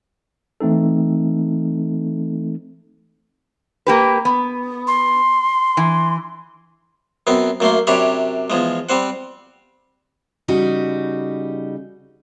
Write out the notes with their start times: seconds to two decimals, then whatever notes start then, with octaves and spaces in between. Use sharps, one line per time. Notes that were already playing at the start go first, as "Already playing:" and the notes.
0.60 E3 A3 C4 D#4 A4
3.87 A#3 G4 B4
4.25 B3
4.87 C6
5.77 E3
7.27 F#2 B3 C4
7.60 F#2 A3 A#3 C6
7.87 F#2 C3 D4 G4 C#5 B5
8.50 E2 F3 G#3
8.89 G3 C4 C5 F#5
10.48 C#3 G3 D#4 F#4